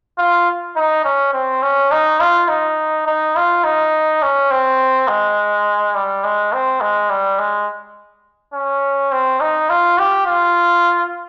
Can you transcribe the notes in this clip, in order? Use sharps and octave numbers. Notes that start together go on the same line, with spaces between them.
F4
D#4
C#4
C4
C#4
D#4
F4
D#4
D#4
F4
D#4
C#4
C4
G#3
G3
G#3
C4
G#3
G3
G#3
C#4
C4
D#4
F4
G4
F4